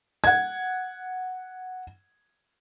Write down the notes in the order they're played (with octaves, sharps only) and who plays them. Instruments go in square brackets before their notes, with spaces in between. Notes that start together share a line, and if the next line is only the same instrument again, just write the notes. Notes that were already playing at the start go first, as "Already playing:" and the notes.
[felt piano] F#5 G#6